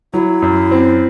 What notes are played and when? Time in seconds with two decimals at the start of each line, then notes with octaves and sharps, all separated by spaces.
0.13 F#3 E4
0.42 F#2
0.71 C4